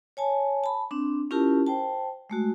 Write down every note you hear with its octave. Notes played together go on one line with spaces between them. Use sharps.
C#5 G#5 A5
A5 B5
C4 D4
C#4 E4 F4 G4 A#4 A5
C5 G5 A5
G#3 A3 F#4